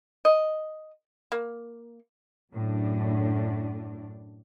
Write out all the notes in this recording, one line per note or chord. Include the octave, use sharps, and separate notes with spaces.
D#5
A#3
F#2 A2 D4